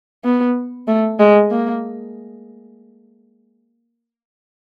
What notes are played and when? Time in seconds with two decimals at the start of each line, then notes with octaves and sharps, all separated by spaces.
0.25 B3
0.88 A3
1.19 G#3
1.51 A#3